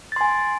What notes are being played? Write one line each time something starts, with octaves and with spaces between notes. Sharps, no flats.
G#5 C6 A6